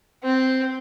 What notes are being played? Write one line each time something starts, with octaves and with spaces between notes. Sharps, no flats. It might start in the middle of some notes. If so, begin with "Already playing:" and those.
C4